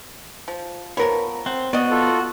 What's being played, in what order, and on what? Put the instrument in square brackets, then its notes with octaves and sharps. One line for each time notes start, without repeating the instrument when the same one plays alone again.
[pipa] F3
[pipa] F3 B3 [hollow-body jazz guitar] A#4 C#5
[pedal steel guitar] C4 [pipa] F#5
[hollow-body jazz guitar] B3 [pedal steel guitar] F#4 [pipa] D5 D#5
[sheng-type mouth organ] F4 A4